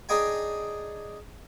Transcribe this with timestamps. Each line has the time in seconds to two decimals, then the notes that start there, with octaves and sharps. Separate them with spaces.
0.09 D4 D#4 G#4 D#5 G5 G#5